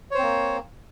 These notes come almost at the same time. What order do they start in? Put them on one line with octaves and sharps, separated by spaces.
C#5 C5 C4 A#3